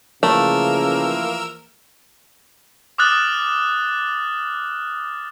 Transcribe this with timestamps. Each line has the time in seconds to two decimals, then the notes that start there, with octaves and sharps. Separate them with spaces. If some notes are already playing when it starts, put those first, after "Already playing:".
0.23 C#3 E3 F3 A3 A#3 A#4 E6
2.98 D6 D#6 F6 F#6 A6 F#7